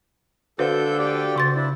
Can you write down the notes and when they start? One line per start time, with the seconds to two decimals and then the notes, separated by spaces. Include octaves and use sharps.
0.59 D3 F#4 A4 B4 C5 F5 G6
0.98 G4 D5 G5
1.36 C#3 C6 A6
1.56 D4 E4